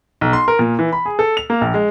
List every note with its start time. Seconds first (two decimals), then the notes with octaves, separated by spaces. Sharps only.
0.21 B1
0.33 C6
0.48 A#4
0.59 A#2
0.79 E3
0.93 B5
1.06 G#4
1.19 A4
1.37 F7
1.50 A#3
1.61 A#1
1.74 G#3